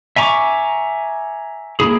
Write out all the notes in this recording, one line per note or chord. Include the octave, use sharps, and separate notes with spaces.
E5 G#5 A#5 C#6 D6
A#3 E4 G#4